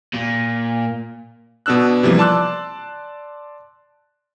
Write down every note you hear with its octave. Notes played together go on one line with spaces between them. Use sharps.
A#2
B2 B3 D4 E6 F#6
C3 E3 F3 G3 A#3
D5 A5 C6 D6 E6 F#6